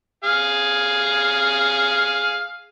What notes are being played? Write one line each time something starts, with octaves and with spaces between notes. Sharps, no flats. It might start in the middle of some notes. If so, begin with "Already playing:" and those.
G#4 F5